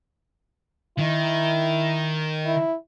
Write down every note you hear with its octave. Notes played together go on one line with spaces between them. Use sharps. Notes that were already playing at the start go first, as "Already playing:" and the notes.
D#3 E4
E4